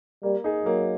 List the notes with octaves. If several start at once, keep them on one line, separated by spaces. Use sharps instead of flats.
G3 A#3
D#4 G#4
F#3 A#3